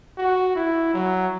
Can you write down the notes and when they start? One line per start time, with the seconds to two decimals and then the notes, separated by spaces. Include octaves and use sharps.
0.17 F#4
0.55 E4
0.93 F#3